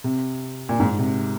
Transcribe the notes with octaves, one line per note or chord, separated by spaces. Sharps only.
C3
A#2
G#2
C3